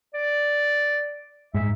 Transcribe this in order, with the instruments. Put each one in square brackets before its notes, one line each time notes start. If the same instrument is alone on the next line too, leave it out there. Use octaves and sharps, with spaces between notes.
[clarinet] D5
[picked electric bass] G#2 [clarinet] E5